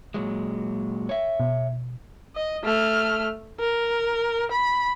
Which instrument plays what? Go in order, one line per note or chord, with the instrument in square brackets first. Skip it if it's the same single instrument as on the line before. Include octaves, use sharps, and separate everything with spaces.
[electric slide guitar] A#2 F#3 G#3
C#5 E5
[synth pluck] B2
[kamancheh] D#5
A3 F6
A#4
B5